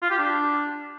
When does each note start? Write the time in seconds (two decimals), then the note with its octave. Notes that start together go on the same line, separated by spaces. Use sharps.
0.02 F4
0.10 G4
0.18 D4